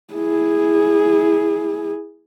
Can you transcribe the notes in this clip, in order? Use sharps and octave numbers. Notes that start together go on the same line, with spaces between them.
E4 G#4